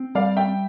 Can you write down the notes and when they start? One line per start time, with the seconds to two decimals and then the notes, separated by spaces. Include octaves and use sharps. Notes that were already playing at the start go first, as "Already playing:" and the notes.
Already playing: C4
0.15 G3 D5 F5
0.37 E5 G5